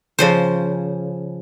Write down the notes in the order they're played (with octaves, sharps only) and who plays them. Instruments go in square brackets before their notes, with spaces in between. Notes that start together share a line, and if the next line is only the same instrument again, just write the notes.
[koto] C#3 F3 C5